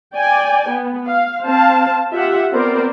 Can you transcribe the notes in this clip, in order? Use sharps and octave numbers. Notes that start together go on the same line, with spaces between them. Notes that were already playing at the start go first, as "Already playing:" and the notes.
D5 G5 G#5
B3
F5
C4 C5 F5 A5
F4 G4 E5 F#5
B3 C4 A#4 C5 D5